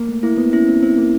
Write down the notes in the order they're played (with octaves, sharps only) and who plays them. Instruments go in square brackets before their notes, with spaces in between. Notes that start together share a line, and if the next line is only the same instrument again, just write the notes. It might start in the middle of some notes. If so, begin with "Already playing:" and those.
Already playing: [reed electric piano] A#3
A3
[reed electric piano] A#3 [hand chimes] E4
[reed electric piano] B3
[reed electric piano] C#4 [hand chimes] E4
[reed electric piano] C4
[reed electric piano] C4 [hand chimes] E4
[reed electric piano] A#3